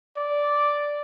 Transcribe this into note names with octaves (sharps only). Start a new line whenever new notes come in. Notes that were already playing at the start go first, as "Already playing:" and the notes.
D5